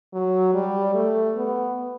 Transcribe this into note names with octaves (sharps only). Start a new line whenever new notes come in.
F#3
G3
A3
B3